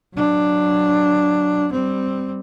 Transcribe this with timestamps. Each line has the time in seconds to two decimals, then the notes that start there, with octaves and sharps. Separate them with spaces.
0.14 F#3 D4
1.72 G3 C4